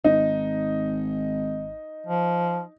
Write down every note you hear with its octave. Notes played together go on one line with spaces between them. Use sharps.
G#1 D#4
F3